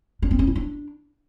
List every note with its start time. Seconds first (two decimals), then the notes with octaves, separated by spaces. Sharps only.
0.22 D4
0.31 C4
0.39 C#4
0.47 E4
0.55 D4